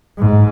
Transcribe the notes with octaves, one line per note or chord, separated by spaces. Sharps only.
G#2